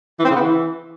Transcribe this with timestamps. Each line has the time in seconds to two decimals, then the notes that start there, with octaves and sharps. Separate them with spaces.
0.19 E3
0.25 C4
0.30 C#3
0.36 B3
0.41 E3